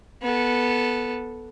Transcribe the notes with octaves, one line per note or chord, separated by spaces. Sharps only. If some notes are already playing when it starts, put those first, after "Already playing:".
B3 A4